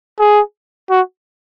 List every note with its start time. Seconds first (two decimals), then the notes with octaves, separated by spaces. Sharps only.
0.19 G#4
0.90 F#4